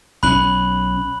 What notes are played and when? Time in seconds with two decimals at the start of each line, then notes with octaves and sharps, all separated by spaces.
0.23 B1 C4 C#4 B5 F#6 F#7